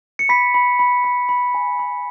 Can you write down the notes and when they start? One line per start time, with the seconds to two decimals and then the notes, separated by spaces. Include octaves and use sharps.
0.19 C#7
0.29 B5 B6
0.54 B5
0.79 B5
1.04 B5
1.29 B5
1.54 G#5
1.79 B5